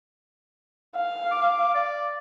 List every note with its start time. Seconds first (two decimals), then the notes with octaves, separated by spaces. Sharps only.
0.95 F5
1.31 D6
1.74 D5